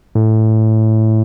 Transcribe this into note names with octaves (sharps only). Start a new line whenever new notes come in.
A2